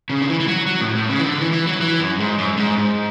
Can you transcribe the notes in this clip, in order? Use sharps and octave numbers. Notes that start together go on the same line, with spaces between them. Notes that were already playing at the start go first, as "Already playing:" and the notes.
C#3
D3
E3
E3
F#3
F#3
A2
A2
C#3
E3
D3
E3
E3
F#3
E3
F#2
G#2
F#2
G#2
G#2